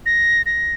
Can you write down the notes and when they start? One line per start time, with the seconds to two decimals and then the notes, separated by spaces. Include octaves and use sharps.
0.06 A#6
0.46 A#6